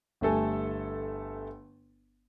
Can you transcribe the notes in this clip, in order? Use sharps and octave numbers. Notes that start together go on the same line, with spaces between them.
G1 G3 A3 A4 G#5